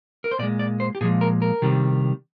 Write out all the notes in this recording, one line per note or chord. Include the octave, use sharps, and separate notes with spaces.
A#4
C5
A#2 G#3 D5
D5
C5
G4
A#2 F3 G#3 G#4
A#4
A#4
C3 D#3 G3